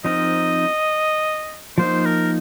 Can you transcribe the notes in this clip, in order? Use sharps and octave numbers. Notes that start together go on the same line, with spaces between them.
F3 C4 D#4 A#4 D#5
F3 A#3 D#4 C5
A#4